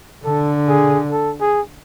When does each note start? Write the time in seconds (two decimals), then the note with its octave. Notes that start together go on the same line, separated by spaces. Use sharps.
0.25 D3 A4
0.68 G#4
1.12 A4
1.41 G#4